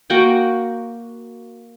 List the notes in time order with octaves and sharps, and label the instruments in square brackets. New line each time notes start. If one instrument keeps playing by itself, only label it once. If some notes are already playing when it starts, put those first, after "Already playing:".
[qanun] A#3 F#4 F#5 G5